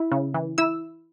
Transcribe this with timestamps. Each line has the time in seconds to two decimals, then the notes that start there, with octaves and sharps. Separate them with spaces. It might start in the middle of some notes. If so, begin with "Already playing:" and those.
Already playing: E4
0.12 C#3
0.34 E3
0.58 E4 E6